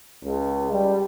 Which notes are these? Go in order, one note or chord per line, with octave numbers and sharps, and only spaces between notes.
C#2
G3